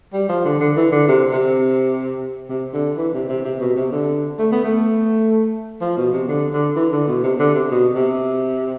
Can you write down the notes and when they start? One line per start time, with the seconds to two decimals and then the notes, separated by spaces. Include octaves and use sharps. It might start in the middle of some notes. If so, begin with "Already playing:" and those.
0.13 G3
0.29 F3
0.45 D3
0.60 D3
0.76 E3
0.92 D3
1.08 C3
1.31 C3
2.50 C3
2.73 D3
2.97 E3
3.13 C3
3.29 C3
3.45 C3
3.60 B2
3.76 C3
3.92 D3
4.39 A3
4.52 B3
4.64 A3
5.81 F3
5.97 B2
6.13 C3
6.28 D3
6.52 D3
6.76 E3
6.92 D3
7.07 B2
7.23 C3
7.39 D3
7.55 C3
7.70 B2
7.95 C3